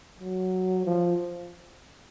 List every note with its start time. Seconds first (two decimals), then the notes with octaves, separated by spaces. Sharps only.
0.20 F#3
0.85 F3